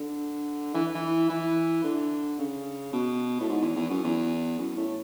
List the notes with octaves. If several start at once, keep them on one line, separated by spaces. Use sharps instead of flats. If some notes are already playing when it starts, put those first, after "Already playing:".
Already playing: D3
E3
E3
E3
D3
C#3
B2
A2
G#2
E2
E2
F#2
E2
F#2
A2